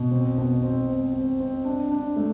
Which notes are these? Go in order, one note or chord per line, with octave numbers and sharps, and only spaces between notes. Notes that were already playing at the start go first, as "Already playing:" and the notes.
Already playing: B2
C4
B2
C4
C4
C4
C4
D4
D4
A3